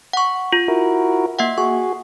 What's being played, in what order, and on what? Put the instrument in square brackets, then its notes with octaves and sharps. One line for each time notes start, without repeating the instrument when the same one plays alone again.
[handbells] F#5 C#6
F4
[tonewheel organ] E4 F#4 A#4
[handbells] A#3 E5 F#5
[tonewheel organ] F#4 G#4 [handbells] C#6